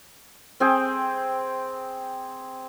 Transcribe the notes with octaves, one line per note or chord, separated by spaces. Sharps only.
C4 G#4 G5